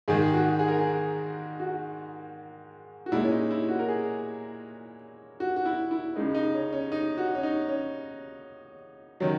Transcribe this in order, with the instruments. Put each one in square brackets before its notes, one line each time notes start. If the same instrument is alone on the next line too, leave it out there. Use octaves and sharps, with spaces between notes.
[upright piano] G#2 D#3 G#3 G#4
G#4
F#4
G#4
A#4
G#4
F#4
F#4
A#2 G#3 E4
C#4
D#4
E4
F#4
A#4
G#4
F#4
F#4
E4
E4
C#2 C#3 G#3 D#4
D#4
C#4
C#4
D#4
F#4
C#4
D#4
C#4
D#3 F#3 C#4